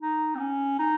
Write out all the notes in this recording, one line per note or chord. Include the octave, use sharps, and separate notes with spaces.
D#4
C4
C#4
D#4